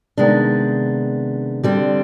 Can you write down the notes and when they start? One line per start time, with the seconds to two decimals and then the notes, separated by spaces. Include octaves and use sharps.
0.17 C3 D#3 G#3 B3 D4
1.63 D3 G3 C4